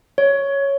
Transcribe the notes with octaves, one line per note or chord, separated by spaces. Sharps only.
C#5